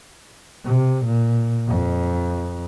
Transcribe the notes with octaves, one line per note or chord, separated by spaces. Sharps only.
C3
A#2
F2